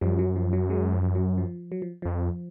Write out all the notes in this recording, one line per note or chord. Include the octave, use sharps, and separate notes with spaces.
F#2 F3 G3
F#3
F3
F#3
F#3 G#3
F3
F#3
F3
F#3
F3
F2 F3